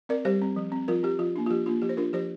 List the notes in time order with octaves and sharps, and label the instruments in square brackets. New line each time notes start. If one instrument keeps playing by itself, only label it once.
[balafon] C4 A#4 D5
G3 G4 C5
C4
F3
C4
F3 F4 A#4
C4 G4
F3 F4
A#3 D4
F4
F3 G4
A#3 D4 F4
F3 G4
C5
D4 F4 A#4
F3 G4 C5